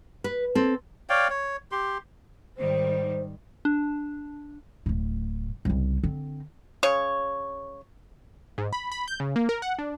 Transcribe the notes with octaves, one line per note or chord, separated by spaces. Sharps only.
B4
C4 A4
C#5 D5 F5 G5
C#5
G4 C6
G#2 D#3 G3 C5
D4
D1 A2
C2 C#3
D3 C4
C#3 C#5
G#2
B5
B5
G6
C#3
A#3
A#4
F#5
D4